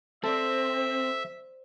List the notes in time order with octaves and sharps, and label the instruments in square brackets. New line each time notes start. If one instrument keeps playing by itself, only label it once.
[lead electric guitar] C4 [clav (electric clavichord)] A4 [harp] C5 D5 [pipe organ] E5